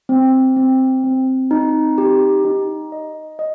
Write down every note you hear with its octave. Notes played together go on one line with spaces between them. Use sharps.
C4
C4
C4
D#4
G4
D#4
D#5
D#5